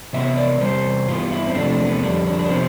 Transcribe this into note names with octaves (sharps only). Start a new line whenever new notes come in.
C3 E3 B3 E5
D5
E2 C3 G3 C5
G2 E3 B3 F4
E4
C4
E2 C3 F3 A3 D4
D4
B3
F2 D3 G3 D4
D4
D4
C3 F3 B3 C4